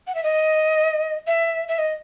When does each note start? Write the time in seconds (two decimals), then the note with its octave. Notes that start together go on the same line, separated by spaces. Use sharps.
0.07 F#5
0.15 E5
0.23 D#5
1.27 E5
1.68 E5
1.79 D#5